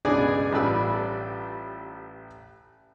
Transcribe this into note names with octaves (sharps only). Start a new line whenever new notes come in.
C#2 G2 B2 G#4 D5 G#5
A1 G3 F4 B4 D5 E6